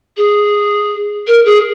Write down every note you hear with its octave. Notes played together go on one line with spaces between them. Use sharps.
G#4
A#4
G#4